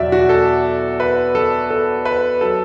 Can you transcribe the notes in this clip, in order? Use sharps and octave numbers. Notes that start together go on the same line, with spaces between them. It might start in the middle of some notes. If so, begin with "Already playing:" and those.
Already playing: E2 B2 F#3 D5 E5
F#4
A4
B4
A4
A4
B4
F#3 A4